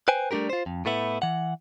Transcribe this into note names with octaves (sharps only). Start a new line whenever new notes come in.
B4 C5 G5 G#5
G3 A3 D4 G4 A#4
F4 C5
F2
A2 A3 B3 E4
E3 F#5